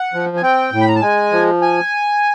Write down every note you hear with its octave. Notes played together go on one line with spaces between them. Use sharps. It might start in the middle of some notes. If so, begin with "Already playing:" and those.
Already playing: F#5
F3
G#5
C4 G5
A2
B5
A#5
A5
G#3 G#5
F3
G#5